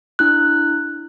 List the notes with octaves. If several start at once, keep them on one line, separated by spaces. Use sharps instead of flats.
D4 E4 F#6